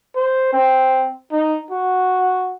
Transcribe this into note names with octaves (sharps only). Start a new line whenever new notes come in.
C5
C4
D#4
F#4